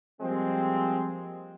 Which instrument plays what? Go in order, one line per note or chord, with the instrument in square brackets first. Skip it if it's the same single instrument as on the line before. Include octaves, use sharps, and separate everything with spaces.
[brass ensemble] F3 G3 G#3 A#3 C4